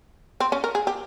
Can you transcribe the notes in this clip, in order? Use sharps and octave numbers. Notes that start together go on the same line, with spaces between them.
C4
C#4
A#4
G#4
G4